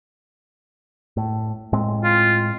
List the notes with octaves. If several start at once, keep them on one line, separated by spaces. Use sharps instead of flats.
A2
A2 G#3 C4
F4